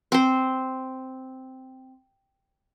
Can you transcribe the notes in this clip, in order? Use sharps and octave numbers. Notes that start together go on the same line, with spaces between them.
C4 C5